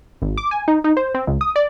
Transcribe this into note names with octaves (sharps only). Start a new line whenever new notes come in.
G#1
D6
G#5
D#4
D#4
C5
C4
C#2
D#6
D5